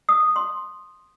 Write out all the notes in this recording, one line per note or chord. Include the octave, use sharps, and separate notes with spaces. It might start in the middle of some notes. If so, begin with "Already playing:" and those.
D#6
C6